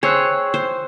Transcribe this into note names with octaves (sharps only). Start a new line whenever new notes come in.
G#4 C5 C#5 G5 E6 F#6
C5